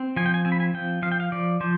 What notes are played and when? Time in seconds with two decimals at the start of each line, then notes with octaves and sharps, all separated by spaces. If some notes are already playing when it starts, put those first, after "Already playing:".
Already playing: C4
0.16 F3 G#5
0.26 G5
0.34 G#5
0.45 C4 G#5
0.52 B5
0.60 G#5
0.74 F3 G5
1.02 F3 F5
1.12 G5
1.20 F5
1.32 F3 D5
1.61 F3 C5